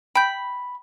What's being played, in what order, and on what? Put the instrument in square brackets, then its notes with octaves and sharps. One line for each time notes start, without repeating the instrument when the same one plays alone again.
[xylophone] G5 G6 [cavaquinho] B5